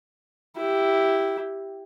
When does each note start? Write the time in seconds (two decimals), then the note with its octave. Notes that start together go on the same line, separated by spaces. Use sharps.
0.58 E4 G4